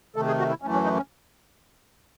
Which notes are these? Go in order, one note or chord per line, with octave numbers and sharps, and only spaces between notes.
C3 D#3 A3 A4
G#4
F#4
E4
F#2 E3 A3 C#4
C#4
D#4
C#4